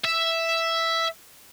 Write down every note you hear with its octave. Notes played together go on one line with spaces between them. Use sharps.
E5